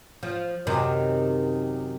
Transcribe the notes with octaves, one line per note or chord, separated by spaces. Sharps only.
F3
F#2 C3 D#3